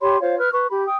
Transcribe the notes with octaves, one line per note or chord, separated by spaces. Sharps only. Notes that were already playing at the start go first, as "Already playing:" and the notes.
G4 C#5 B5 C6
F4 C5 C#5 F5
B4 F6
B4 C#6
G4 B5
G5 D#6